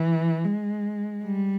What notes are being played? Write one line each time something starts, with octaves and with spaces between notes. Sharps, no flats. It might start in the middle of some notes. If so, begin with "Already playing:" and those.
Already playing: E3
G#3
G3